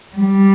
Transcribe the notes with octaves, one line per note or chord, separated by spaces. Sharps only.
G3